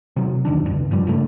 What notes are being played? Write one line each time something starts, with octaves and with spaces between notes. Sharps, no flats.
C3 F#3
E1 D2 D#3 D4
G1 C#2 G2
G2 F3 G3
G#1 C#3 A3 D4